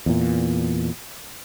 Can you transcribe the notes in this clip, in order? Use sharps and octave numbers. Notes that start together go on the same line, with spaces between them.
E2 A#2